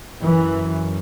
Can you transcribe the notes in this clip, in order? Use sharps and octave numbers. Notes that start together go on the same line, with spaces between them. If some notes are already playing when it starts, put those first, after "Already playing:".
F#2 E3